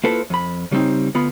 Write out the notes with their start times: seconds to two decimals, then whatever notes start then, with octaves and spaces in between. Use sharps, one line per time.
0.04 A#3 E4 F4 A4 B4 C5
0.30 F2 B5
0.71 C#3 G3 A3 C4 D#4
1.15 D2 B3 F4 B5